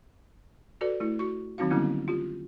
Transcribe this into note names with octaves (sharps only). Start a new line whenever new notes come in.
F#4 A4 B4 D5
A3 E4
F#4 C#6
D#3 F#3 C4 D#4 F#4 F5
D3 G3 A#3 B3 C#4 E4
F4 G4